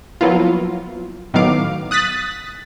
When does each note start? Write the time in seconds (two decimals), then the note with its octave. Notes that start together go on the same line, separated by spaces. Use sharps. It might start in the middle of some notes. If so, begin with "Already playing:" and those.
0.21 F3 F#3 A#3 B3 E4 F4
1.34 A2 D#3 F#3 B3 F5 D6
1.91 D#6 F#6 A6 B6